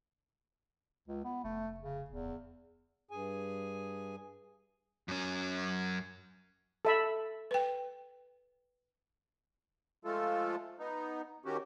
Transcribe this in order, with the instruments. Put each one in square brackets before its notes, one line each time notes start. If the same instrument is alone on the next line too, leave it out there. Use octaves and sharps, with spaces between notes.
[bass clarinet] C#2
B3
[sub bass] F1 [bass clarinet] A3
[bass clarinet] C#3
[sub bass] D1 [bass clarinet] E2
[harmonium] G2 G#4 G#5
[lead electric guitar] F#2 C#4
[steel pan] A4 E5 B5
[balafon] B4 G5
[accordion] F3 G#3 A3 F4 A4
B3 D#4
D#3 C#4 F#4 G4